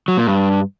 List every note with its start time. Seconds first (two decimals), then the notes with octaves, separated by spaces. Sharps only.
0.08 F#3
0.17 A#2
0.27 G2